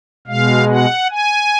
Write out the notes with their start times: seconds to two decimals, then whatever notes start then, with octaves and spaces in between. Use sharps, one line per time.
0.27 B2 G#3 F5
0.70 F#5
1.11 G#5